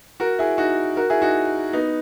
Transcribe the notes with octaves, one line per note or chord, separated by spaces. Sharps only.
F#4 A#4
E4 G#4
D#4 F#4
F#4 A#4
E4 G#4
D#4 F#4
B3 D#4